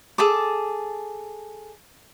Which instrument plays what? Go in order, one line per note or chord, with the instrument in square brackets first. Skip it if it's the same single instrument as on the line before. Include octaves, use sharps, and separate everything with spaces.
[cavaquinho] G#4 A4 A5 D6